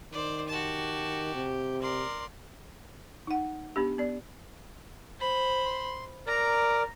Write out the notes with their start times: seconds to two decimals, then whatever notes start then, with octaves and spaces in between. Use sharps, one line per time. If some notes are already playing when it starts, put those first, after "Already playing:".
0.12 D#3 C5 D5
0.48 F#4 G4 A5
1.34 C3
1.82 A#4 D5 C6
3.27 D#4 F#5
3.76 B3 D4 G4
3.98 B3 D5
5.19 C5 B5
5.65 C6
6.27 A#4 D5 A#5